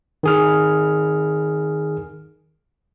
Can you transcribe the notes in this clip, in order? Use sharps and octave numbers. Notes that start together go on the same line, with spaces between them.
D#3 G#4 F6